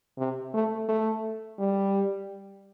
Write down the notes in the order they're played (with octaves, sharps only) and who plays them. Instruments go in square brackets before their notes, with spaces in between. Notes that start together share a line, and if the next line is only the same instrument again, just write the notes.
[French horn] C3
A3
A3
G3